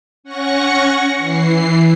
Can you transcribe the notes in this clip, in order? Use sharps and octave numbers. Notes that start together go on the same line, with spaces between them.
C#4 F#5 C#6 A#6 C#7
E3 C7